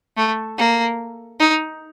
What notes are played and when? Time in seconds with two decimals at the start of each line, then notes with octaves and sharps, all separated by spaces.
0.17 A3
0.58 A#3
1.40 D#4